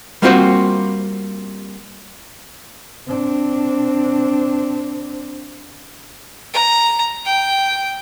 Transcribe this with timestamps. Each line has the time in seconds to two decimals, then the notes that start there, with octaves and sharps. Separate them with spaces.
0.22 G3 A#3 C4 F4 F#4 C5
3.07 C4 D4
6.53 A#5
7.25 G5